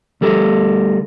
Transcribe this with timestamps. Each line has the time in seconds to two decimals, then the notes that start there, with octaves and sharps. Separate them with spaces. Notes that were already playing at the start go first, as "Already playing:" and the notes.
0.21 D2 G3 A4 A#4